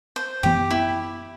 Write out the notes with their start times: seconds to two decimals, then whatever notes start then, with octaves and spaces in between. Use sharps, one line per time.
0.16 C5
0.43 F#2 E3 B3 G4
0.71 E4